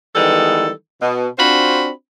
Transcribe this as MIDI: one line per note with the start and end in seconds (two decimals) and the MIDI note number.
0.16 0.69 51
0.16 0.69 52
0.16 0.69 55
0.16 0.69 56
0.16 0.69 59
0.16 0.69 69
1.02 1.28 47
1.39 1.90 60
1.39 1.90 62
1.39 1.90 65
1.39 1.90 66
1.39 1.90 72
1.39 1.90 83